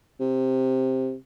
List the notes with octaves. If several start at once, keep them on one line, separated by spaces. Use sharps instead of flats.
C3